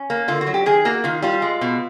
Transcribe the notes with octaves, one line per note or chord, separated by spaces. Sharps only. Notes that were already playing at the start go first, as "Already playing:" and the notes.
Already playing: C#4
A#3
D3 F4
F#4
F#3
G4
D#3 G#4
A#3 F#4
D#3 F4
G3 F4
G#3
B2